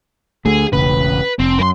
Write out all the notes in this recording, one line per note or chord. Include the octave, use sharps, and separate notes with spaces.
D2 A3 G#4
E1 A1 C#3 B4
F1 C4
F#2 A#4 C6